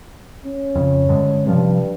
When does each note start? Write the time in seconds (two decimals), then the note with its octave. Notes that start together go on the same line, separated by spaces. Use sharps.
0.45 C#4
0.75 F2 C#3
1.09 G2 D3 G#3
1.47 G2 C3 F3